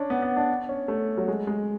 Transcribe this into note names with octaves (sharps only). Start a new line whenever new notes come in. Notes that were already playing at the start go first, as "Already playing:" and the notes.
Already playing: C#4 D4
B3
B3
D4
C#4
A3
F#3
G#3
G#3